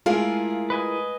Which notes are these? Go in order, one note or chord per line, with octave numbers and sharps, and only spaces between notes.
G#3 A3 E4 F4 G#4 A#4 F5
B4 D#5 G#5